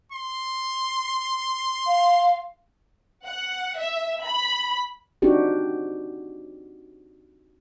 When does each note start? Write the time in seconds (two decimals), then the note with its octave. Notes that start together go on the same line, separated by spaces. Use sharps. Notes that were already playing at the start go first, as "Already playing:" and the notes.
0.12 C6
1.86 F5
3.24 F#5
3.76 E5
4.23 B5
5.22 C4 D4 D#4 F#4 G4